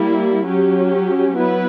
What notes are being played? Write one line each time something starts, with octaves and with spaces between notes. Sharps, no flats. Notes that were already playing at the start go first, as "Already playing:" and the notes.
Already playing: G3 A#3 E4
F#3 C#4 G4
F#3 B3 E4 B4